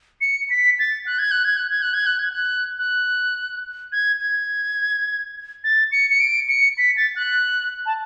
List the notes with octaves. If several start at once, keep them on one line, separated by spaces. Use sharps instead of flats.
C#7
B6
A6
F#6
G#6
F#6
G#6
F#6
G#6
F#6
G#6
F#6
G#6
F#6
F#6
G#6
G#6
A6
C#7
C#7
D7
C#7
B6
A6
F#6
A5